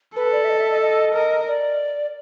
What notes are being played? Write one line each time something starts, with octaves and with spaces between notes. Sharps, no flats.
A4 B4
D5
E5
D#5
E5
D#5
D#5
A#4
D5